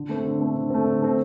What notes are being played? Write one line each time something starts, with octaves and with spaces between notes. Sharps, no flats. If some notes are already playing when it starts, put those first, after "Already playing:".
Already playing: D3
A3 C4
D3
A3 C4
D3
A3 C4
D3
A3 C4